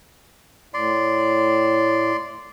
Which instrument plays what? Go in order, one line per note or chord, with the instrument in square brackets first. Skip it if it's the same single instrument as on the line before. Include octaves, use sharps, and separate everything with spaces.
[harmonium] A2 [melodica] D5 C6